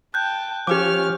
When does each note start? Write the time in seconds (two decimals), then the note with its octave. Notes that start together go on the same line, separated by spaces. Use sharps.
0.14 G5 A5 F#6 G6
0.67 F3 C#4 G4 D6 F6